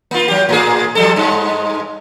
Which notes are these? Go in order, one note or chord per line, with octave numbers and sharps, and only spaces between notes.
A#3 F4
F#3 G4
A2 A#3 G#4
F3 G3 A4
G2 G#3